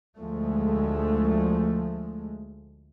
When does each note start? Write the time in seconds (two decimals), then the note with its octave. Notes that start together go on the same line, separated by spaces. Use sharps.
0.18 D2 F3 G#3 A3